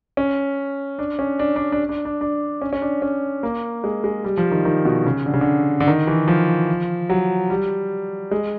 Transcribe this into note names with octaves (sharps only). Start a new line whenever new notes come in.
C#4
D4
C#4
D4
D4
D4
D4
D4
D4
C#4
C#4
D4
C#4
A#3
G#3
G#3
G3
F3
D#3
D#3
B2
C#3
D3
C#3
D3
D3
D#3
E3
F3
F#3
G3
G#3